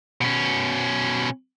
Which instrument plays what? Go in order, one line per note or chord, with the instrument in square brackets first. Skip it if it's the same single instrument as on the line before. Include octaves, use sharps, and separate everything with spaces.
[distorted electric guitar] B2 C#4